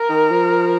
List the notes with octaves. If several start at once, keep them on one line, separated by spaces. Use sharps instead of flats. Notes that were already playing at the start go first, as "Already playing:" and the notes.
Already playing: A#4
D#3
F3